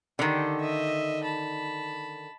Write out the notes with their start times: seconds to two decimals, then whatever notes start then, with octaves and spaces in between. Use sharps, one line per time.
0.19 D3 D#3 G4 A4
0.60 D#5 E5
1.23 A5 B5